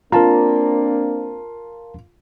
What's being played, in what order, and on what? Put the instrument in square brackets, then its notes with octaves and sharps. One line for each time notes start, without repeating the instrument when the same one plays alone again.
[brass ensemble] A#3 C4 D4 [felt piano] F4 [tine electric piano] A#4 A5 A#5